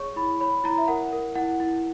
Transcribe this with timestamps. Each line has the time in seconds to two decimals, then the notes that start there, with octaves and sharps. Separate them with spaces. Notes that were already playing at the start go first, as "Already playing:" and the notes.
Already playing: G#4 C#5 C#6
0.16 E4 B5
0.41 C#5 B5
0.64 E4 A#5
0.78 E5
0.88 A#4 F#5
1.12 A#4
1.35 E4 F#5
1.60 E4